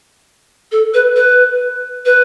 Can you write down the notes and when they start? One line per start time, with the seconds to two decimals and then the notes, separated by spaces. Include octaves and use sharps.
0.72 A4
0.94 B4
1.16 B4
2.06 B4